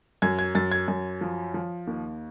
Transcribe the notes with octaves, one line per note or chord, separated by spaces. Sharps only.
F#2 G#6
G#6
F#2 A6
G#6
F#2
F3
F3
D#2